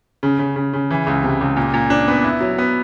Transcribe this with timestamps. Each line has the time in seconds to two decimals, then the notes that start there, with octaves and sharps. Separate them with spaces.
0.23 C#3
0.39 C#3
0.56 C#3
0.73 C#3
0.90 E3
1.07 C#2
1.23 C3
1.41 C#2
1.57 A#2
1.74 A#2
1.90 D4
2.08 B3
2.24 E4
2.41 F#3
2.58 B3